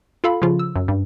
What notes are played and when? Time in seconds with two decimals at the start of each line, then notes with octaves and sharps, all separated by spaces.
0.24 F4 A4 F5 B5
0.42 C#3 F3 F4
0.59 E6
0.76 F#2
0.88 G2